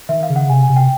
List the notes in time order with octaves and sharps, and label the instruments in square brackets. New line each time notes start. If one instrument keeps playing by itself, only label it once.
[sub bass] D#3 [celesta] E5
[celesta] F5
[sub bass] C#3
[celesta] F#5
[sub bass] C3 [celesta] G#5
[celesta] G#5
[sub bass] C3
[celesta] G5